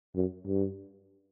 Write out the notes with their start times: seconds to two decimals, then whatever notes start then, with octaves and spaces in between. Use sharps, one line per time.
0.16 F#2
0.46 G2